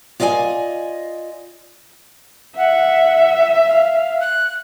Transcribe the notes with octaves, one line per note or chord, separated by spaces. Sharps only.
F4 D5 D#5 F#5 G#5
E5 F#5
F5
F#6